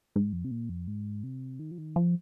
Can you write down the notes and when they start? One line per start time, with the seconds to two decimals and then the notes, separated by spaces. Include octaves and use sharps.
0.16 G#2
0.33 F2
0.45 C3
0.51 A#2
0.69 F2
0.88 G#2
1.24 C3
1.59 D#3
1.71 F3
1.78 D#3
1.96 F3